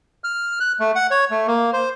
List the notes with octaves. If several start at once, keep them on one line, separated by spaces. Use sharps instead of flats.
F6
F#6
A3
F#5
C#5
A3
A#3
C5